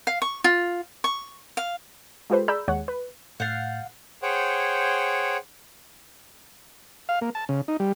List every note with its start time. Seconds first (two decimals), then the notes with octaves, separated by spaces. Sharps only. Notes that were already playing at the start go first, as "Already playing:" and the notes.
0.07 F5
0.22 C#6
0.44 F4
1.04 C#6
1.57 F5
2.30 G#3 F4 G4 A4 B4 C5
2.48 G#4 D5 A#5 B5 E6 G6
2.68 D#2 G#3 C#5 F#5
2.88 B4
3.40 A2 F5 F#5 G6 A6
4.22 G#4 C5 C#5 F#5 G5
7.09 F5
7.21 A#3
7.35 A5
7.49 C#3
7.68 D#4
7.80 G3